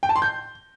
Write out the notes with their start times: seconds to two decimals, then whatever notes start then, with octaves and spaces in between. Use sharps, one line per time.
0.03 G5
0.09 A5
0.16 C6
0.22 G6